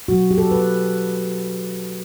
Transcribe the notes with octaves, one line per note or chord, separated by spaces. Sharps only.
B2 F#3 A3 F#4
G4
A4
B4